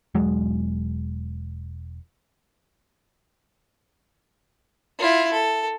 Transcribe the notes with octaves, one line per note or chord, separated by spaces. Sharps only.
E1 F#3 G#3
E4 F4
A4